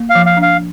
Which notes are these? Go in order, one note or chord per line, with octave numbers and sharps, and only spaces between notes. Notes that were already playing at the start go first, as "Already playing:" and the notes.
Already playing: A#3
F5
F3
F5
D4
F5